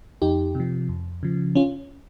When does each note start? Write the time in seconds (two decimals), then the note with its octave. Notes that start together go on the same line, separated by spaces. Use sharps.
0.22 F2 D#4 G4
0.55 C3 F3
0.89 F2
1.23 C#3 F3
1.55 C#4 F4